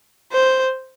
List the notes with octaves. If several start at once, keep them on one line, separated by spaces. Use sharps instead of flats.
C5